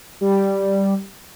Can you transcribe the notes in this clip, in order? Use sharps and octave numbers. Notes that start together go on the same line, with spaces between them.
G3